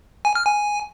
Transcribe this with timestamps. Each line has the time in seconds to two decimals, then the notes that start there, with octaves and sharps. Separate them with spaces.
0.25 G#5
0.35 F6
0.46 G#5